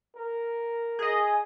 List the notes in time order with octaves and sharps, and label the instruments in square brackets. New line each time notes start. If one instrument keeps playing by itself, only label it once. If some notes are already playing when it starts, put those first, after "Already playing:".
[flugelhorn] A#4
[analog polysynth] G#4 D#5